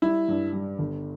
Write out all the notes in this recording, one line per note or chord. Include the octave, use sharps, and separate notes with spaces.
G3 E4
G2
G3
G1